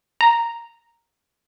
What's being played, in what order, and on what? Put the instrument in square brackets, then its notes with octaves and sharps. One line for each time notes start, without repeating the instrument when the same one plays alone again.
[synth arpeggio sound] A#5